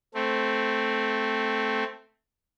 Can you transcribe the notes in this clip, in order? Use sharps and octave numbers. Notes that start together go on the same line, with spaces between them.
A3 C4